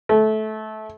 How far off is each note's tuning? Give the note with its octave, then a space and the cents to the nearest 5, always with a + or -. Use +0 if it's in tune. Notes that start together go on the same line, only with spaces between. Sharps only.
A3 -20